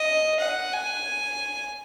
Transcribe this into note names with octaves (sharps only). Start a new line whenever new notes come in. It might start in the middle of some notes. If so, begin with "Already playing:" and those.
Already playing: D#5
F#5
G#5